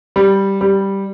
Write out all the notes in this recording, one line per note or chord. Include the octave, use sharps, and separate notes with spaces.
G3
G3